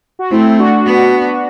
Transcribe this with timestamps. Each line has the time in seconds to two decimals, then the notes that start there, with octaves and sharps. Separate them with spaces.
0.19 F#4
0.31 A3 C4 E4
0.59 D4 F#4
0.86 B3